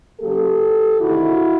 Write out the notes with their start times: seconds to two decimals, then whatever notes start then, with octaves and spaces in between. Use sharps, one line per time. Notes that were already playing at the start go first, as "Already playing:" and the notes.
0.20 C#3 F#3 A#3 G4 A4
1.01 D2 C3 D#3 E4 F#4